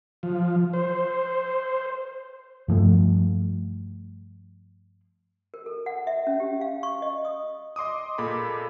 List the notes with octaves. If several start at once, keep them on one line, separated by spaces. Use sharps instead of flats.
F3
C5
G2 F3 A3
A#4
A4
F#5
E5
C#4
G4
F5
C#6
D#5
D#6
D#5 C6 D6 D#6
A#2 A#3 G#4 A4 B5 D6